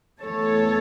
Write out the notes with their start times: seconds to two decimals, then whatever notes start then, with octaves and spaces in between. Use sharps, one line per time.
0.22 E2 E3 A3 A4 C#5